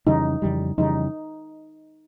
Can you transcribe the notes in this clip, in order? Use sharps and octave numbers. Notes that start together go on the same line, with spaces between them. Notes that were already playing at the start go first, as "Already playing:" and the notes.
F2 C#3 E3 G3 D#4
F2 C#3 E3 G3
F2 C#3 E3 G3 D#4